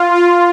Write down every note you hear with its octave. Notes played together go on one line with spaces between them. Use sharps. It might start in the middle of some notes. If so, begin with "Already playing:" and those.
Already playing: F4
F4